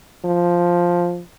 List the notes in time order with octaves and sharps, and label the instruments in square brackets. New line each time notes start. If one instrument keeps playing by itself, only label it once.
[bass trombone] F3